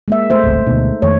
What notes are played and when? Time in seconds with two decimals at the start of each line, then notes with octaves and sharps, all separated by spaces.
0.08 G#3 A#3 E5
0.30 A3 C5 E5
0.43 D1 G#1 C#2
0.67 D2 B2 D#4
1.02 F2 D#3 A3 C#5